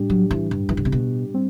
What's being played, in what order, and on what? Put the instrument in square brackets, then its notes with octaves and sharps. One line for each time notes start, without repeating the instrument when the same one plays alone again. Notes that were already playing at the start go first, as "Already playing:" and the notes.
Already playing: [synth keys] A2 G3 D4 G4
[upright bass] F#3
E3
G2
E3
D3
C3
B2
[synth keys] G3 C4